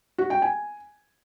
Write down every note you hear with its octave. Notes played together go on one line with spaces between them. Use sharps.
F#4
G5
G#5